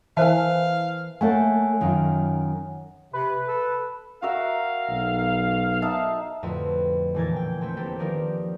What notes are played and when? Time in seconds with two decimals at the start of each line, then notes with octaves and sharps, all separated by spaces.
0.17 E3 A#4 C5 E5 F5 G#5 A5
1.21 A3 A#3 A4 C#5 F#5 G#5
1.81 F#2 D#3 F4
3.13 C3 B4
3.48 A4
4.22 F#4 A#4 E5 F5
4.89 B1
5.82 D#4 E5 A5
6.43 F2 A2 D3 B3 F#4 B4
7.14 E1 A#2 E3 A#4 G#6 A6
7.36 G5
7.61 A3 C4 B4 G5
7.77 A#3 C4 G4 A4 B4
7.99 D#3 F3 G4 A#4 D5 D#5